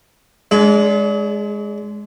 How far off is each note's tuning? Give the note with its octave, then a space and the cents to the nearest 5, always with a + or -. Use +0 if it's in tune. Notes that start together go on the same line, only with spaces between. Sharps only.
G#3 +0 D4 -35 G#4 +45